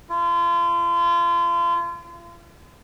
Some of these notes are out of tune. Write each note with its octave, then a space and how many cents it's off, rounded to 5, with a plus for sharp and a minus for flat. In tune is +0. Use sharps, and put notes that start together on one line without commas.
F4 -35